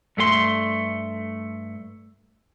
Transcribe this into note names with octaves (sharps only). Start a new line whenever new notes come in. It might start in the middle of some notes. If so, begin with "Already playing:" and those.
G2 A3 G4 C6